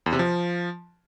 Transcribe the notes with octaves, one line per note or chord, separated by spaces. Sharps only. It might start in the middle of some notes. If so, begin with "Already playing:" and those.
E2
C3
F3